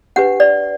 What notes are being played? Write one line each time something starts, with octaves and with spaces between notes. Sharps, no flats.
D4 G4 B4 F#5
D5